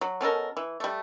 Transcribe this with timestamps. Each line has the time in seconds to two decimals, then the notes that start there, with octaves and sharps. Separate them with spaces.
0.01 F#3
0.21 B2 C#4 A4 A#4
0.57 E3
0.80 G3 A3